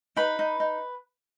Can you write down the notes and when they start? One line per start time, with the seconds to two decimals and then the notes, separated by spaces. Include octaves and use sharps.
0.16 D#4 B4 B5
0.39 D#4
0.60 D#4